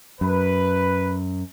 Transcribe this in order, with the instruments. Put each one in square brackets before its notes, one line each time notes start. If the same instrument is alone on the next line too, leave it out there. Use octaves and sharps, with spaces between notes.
[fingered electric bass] F#2 [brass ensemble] B4